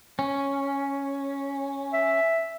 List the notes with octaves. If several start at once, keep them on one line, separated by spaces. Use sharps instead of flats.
C#4
E5